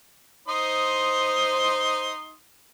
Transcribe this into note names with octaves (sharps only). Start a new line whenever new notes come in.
D#4 C5 C6 D#6